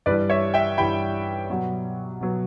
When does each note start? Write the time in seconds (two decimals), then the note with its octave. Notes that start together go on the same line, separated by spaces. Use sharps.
0.06 G2 E3 G3 B4 D5
0.30 C#5 E5
0.54 E5 G5
0.78 G2 E3 G3 G5 B5
1.49 B2 F#3 B3
2.21 B2 F#3 B3